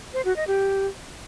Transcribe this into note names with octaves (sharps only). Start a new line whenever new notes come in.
C5
F#4
D#5
G4